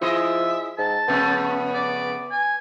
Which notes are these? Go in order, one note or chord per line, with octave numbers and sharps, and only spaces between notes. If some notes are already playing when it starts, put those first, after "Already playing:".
F3 E4 G#4 D#5 E5
G#2 A5
F2 C#3 A3 B3
D5
G#5